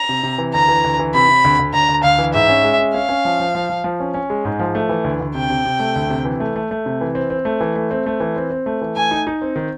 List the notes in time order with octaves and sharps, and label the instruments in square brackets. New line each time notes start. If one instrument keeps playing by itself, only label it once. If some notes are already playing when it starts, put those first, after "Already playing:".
Already playing: [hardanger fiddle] A#5
[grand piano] C3
C3
E3
[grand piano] D2 [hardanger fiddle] A#5
[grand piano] E3
D2
E3
[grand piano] C3 [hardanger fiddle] B5
[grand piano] C3
D2
D2
[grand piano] D2 [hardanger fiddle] A#5
[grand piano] D2
[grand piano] D2 [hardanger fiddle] F5
[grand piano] E3
[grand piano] G#2 [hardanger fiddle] E5
[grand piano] C#4
G#3
C#4
[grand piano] C#4 [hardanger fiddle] F5
[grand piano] C#4
F3
F3
F3
F3
F3
C#4
C#4
G#3
G#2
F3
A3
E3
D2
D2
[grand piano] C3 [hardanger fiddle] G5
[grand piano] C3
C3
A3
D2
C3
E3
A3
A3
A3
C3
E3
C4
C4
A3
E3
A3
C4
A3
E3
C4
C4
A3
E3
[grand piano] A3 [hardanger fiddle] G#5
[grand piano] D#4
D#4
C4
D#3